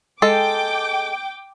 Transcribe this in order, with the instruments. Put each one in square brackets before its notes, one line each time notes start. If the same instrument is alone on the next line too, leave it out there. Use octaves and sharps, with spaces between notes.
[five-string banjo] G#3 A4 [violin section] G5 D6